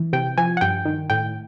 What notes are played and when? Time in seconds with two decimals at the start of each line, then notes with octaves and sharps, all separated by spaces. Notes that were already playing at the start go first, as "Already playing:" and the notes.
Already playing: E3
0.13 C3 G5
0.37 F3 G#5
0.57 F#5
0.61 G2 G5
0.85 D#3
1.10 A2 G5